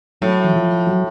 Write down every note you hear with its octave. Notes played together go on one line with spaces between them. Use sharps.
A2 F#3
E3
F3
F#3